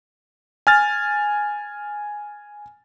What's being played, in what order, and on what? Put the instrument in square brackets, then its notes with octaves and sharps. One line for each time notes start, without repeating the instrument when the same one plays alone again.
[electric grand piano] G#5 F6 A6